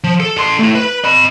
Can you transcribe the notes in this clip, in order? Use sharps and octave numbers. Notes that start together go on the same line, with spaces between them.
F3
A4
A4 C6
A3 E4
B4
D#5 B5